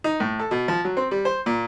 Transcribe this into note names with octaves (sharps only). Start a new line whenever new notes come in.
D#4
A2
A4
B2
F3
F#3
C4
G3
C5
A#2